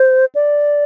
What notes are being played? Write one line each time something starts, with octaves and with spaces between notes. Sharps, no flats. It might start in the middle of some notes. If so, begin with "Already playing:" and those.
Already playing: C5
D5